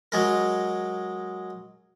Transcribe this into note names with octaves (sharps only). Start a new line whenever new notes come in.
F#3 G#3 A#4